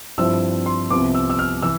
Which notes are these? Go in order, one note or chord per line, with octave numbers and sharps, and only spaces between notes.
G2 F3 C4 E4 E6
C6
C2 C3 F3 B3 D6
E6
E6
F6
E3 E6